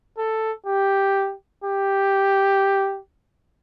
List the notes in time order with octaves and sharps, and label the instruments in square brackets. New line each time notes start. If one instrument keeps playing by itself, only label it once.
[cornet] A4
G4
G4